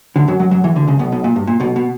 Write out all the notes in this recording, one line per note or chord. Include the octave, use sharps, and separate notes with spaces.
D2 D3
F#2 F#3
F#2 F#3
F#2 F#3
E2 E3
D2 D3
C#2 C#3
B1 B2
B1 B2
A#2
G2
A#2
B1 B2
B2